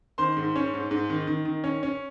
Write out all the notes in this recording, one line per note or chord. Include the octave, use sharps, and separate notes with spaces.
D#3 C5 C6
G#2
C#4
G#2
G#2
D#3
D#3
D#3
C#4
C#4